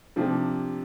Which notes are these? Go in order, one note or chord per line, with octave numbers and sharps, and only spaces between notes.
C3 F3 D4